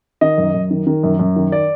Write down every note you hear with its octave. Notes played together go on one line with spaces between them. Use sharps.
D#3 D#5
F#2
F#2
D#3
D#3
F#2
F#2
D#3
D5